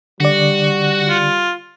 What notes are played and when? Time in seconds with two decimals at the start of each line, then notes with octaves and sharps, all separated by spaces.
0.20 D3 G3 F#4 D5
1.09 F4